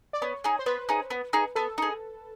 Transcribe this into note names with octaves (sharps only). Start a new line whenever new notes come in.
D5
B3 C#5
D#4 G#4
C5
B3 B4
D#4 G#4
B3
D#4 G#4
B3 A4
D#4 G#4